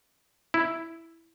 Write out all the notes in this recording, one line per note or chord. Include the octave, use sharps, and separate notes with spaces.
E4